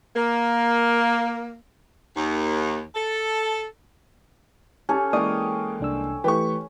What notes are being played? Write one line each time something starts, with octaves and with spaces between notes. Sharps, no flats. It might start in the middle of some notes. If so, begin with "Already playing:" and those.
A#3
D#2
A4
C#4 G4 A4 G#5 A5
E3 G#3 A#3 C#5 D5 G5 D#6
C2 D4 E6
E3 A3 G4 B4 C#6